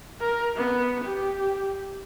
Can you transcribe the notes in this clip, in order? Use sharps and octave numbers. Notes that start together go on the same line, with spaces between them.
A#4
B3
G4